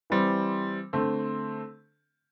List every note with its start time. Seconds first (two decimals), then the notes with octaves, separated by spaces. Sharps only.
0.10 E3 G3 C4
0.93 D3 A3 C4